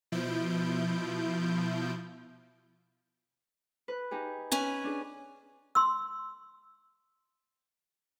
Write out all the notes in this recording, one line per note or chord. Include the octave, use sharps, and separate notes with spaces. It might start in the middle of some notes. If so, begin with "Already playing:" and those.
B2 F3 E4 G6 D7
B4
D#4 G4 G#4
C#4 B4 G#5
D4 G#4
C6 E6